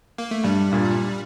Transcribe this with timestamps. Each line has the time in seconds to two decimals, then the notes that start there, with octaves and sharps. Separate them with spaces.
0.18 A#3
0.31 A3
0.43 G2 G3
0.71 G2 A#2